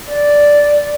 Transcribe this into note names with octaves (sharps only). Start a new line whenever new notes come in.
D5